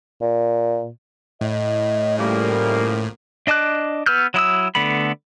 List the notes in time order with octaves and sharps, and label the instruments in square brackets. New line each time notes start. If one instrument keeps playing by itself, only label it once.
[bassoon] A#2
[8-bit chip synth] A2 [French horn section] D#5
[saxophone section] C#3 F3 A#3 [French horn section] G3 A3
[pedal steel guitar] D4 D#5 A5 D6 F#6
B3 B4 E6 F6 G6
F#3 E4 D#6 E6
D3 A3 B3 B5